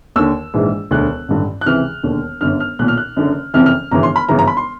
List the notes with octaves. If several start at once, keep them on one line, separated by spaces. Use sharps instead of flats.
D#2 D3 E6
A#1 G#2 E3
E1 D2 D3 F#6
A1 G2 D3
F#6
C#2 C3 E3 F6
E1 D#2 D3
G1 F#2 D3 F6
F6
B1 A#2 F#6
F6
F#6
F#1 F#2 D3
F#1 F2 C3 E3 F6
F6
G1 F#2 C#3 E3 A#5
C6
B5
G1 F#2 C#3 E3 A#5
A#5
B5
C6